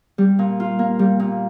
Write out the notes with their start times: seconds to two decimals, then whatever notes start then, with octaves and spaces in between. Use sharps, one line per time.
0.18 G3
0.39 A#2
0.60 F4
0.79 A#3
0.99 G3
1.19 A#2